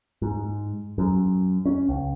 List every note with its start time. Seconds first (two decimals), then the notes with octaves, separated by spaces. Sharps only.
0.22 G#2
0.98 F#2
1.66 C#4
1.89 C#2